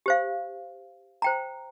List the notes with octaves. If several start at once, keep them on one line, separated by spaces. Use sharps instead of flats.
G4 C5 F5
C5 G5 A#5